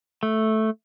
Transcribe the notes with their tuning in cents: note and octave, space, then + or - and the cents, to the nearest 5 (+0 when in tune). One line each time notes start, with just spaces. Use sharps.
A3 -5